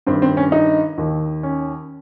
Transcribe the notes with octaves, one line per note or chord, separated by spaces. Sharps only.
G2 D#3 C4
C4
C#4
D#4
D#2 D#3
C#4